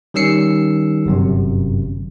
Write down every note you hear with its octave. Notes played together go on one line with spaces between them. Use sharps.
D#3 G3 C#4 E6 C7 C#7
G1 F#2 C3